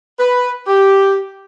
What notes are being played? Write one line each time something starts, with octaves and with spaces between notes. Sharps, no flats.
B4
G4